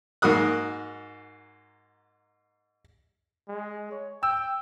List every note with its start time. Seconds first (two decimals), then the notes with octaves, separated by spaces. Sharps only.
0.22 G#2 A#3 F#4 D#6 F#6
3.48 G#3
3.91 C#5
4.23 G5 E6